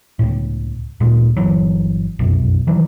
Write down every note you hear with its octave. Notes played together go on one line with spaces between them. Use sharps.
C#2 A2
D1 A#2 G#3
G1 E3 F#3
F1 B1 F#2
D#3 E3 F#3 G3